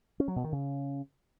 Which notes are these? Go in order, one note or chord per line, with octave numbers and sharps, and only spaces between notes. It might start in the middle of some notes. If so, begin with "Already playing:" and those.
C#4
F#3
B2
D#3
C#3